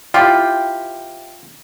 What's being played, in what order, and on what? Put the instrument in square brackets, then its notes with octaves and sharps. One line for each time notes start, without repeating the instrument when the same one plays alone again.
[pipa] C4 E4 G4 [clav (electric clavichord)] F4